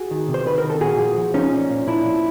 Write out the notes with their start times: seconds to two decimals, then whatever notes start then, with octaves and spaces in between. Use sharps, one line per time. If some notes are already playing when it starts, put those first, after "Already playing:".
Already playing: F#4 G#4
0.11 D#3
0.28 C3
0.34 C5
0.46 D#3 B4
0.58 A#4
0.64 D#3
0.70 A4
0.80 A#2 F#4 G#4
0.99 F3
1.17 F3
1.34 F3 C#4 D#4
1.53 A#2
1.70 A#2
1.87 A#2 D4 E4
2.05 F3